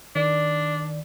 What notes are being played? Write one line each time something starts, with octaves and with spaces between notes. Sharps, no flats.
D#3 D4 D5